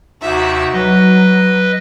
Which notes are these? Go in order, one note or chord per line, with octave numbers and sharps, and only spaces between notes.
D#2 C3 D#4 F#4 E5
F#3 B4 D#5